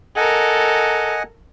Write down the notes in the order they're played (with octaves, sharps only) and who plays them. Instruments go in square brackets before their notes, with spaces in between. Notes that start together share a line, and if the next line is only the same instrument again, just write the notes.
[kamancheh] A4 A#4 [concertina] D#5 F#5 G#5